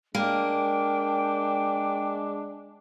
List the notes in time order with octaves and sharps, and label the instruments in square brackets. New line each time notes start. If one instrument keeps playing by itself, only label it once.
[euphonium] G#3 [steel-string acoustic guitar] A#3 [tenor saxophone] D4 [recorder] G5